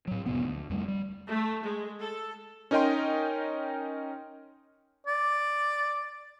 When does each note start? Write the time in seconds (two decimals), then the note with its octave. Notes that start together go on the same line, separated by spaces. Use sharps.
0.07 A2 F#3
0.26 F2 A2 C3 B3
0.44 D2
0.70 F2 G3 A3
0.88 G3
1.28 A3
1.62 G#3
2.01 A4
2.71 C#4 D#4 A#4 D#5 G5 C6
5.07 D5